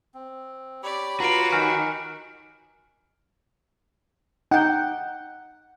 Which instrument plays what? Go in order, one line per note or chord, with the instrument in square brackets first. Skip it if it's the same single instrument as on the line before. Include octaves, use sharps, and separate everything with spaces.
[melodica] C4
[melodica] G4 C#5 B5 [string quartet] D5
[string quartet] F4 B4 [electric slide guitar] F#4 [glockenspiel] A#5 D7
[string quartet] D#3 [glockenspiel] G#5 F6 D7
[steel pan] D#4 G5 [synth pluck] F#5